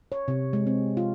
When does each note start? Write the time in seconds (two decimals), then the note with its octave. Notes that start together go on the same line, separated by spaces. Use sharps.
0.12 C#5
0.28 C3
0.53 G#3
0.67 C4
0.97 F4